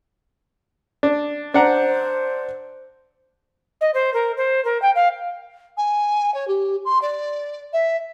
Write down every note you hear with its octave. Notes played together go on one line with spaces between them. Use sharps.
D4
D4 C5 F#5 A#5
D#5
C5
A#4
C5
A#4
G5
F5
G#5
C#5
G4
C6
D5
E5